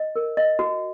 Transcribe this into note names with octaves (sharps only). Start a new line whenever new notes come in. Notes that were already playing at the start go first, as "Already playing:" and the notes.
Already playing: D#5
A#4
D#5
F#4